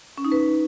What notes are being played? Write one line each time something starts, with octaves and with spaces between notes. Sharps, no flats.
C#4
D#4
B4